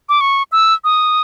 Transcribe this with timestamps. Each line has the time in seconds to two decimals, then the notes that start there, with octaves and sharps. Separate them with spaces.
0.09 D6
0.21 C#6
0.52 E6
0.84 D#6